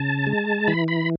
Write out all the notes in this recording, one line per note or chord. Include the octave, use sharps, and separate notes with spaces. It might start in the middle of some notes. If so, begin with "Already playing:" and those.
Already playing: C#3 A5
G#3
E3 B5
B5